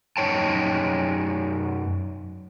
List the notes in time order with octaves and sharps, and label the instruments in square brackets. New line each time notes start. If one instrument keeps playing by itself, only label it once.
[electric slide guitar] F#2 B2 D#4 C#5 G5 A5